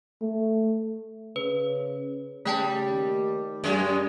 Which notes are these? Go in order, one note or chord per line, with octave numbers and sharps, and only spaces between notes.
A3
C#3 B4
C#3 G3 A3 G5 A5
D#2
F#2 G3 G#3